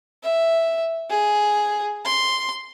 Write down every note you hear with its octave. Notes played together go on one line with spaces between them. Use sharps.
E5
G#4
C6